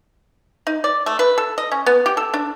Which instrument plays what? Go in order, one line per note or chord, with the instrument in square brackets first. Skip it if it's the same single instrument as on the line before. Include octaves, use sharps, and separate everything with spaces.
[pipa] D#4
D5
A3
B4
A4
D#5
C#4
B3
G4
A4
D4